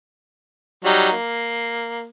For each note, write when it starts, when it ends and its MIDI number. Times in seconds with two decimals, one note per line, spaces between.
0.84 1.12 54
0.84 1.12 55
0.84 1.12 63
1.12 2.06 58